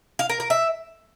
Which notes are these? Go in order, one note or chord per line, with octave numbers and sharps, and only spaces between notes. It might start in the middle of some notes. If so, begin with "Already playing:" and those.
F5
A#4
A#4
E5